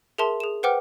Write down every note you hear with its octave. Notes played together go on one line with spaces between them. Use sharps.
G#4 A#4 E5 A5 C6
G#4 E7
B4 C5 F#5 G5 D6 F6